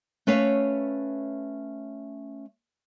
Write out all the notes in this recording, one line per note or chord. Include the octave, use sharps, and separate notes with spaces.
A3 C#4 B4 C#5 E5 F5